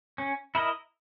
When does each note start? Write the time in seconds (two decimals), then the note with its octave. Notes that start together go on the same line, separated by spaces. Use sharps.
0.18 C#4
0.55 E4 A#4 D#5